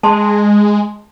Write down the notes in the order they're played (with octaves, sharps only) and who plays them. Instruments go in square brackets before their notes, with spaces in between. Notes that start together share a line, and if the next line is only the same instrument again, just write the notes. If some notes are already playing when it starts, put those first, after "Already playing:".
[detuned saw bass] G#3 [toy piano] A5 C6